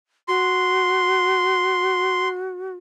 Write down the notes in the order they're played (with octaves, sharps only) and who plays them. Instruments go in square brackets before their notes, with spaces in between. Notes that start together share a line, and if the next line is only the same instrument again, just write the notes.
[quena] F#4 [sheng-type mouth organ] C6